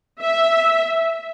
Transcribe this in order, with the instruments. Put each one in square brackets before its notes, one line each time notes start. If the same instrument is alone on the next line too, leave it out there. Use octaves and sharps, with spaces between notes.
[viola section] E5